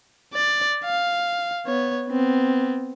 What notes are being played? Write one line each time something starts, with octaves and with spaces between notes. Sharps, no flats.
D5
F5
B3 C#5
B3 C4